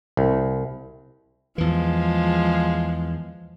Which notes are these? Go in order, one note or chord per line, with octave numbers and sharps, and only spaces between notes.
C2
E2 E3 F3 G#3